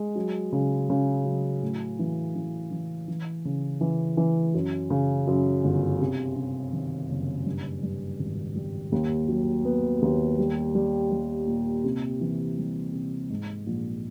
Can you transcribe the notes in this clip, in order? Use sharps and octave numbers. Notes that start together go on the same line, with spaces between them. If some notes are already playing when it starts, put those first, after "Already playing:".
Already playing: G#3
F#3
C#3
C#3
F#3
A2
E3
E3
E3
E3
C#3
E3
E3
F#2
C#3
F#2
G1
C3
C3
D#3
F#1
G2
G2
G#1
G3
D#2
F#3
B3
D#2
G3
G3
G3
A#2
C3
E3
G3
C3
G#2
A#1